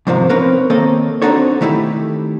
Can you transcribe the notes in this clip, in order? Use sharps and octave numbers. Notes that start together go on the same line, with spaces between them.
F2 G#2 C3 D#3 F3
C4 C#4 A#4 B4
D#3 A#3 C4 A4 C#5 D#5
C4 D4 D#4 F#4 A4 C#5
D#3 A3 D#4 E4 G4